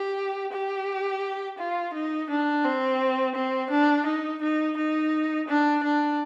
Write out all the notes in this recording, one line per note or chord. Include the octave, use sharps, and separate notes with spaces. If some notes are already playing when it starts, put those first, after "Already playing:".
Already playing: G4
G4
F4
D#4
D4
C4
C4
D4
D#4
D#4
D#4
D4
D4